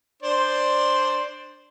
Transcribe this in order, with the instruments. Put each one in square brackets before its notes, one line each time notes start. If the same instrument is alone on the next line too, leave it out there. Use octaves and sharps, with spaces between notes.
[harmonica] D4 C5 D5